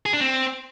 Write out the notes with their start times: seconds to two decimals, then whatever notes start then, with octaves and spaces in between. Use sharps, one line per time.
0.06 G#4
0.13 D4
0.21 C4